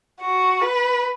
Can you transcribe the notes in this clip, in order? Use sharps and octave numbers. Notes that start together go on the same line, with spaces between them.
F#4
B4